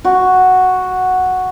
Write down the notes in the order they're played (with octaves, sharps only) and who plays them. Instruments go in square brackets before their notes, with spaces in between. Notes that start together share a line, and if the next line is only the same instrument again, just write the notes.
[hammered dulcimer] F#4